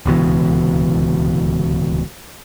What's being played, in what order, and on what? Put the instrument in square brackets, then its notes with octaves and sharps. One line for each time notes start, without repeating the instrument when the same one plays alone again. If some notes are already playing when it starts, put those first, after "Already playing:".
[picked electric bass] D1 C#2 B2 E3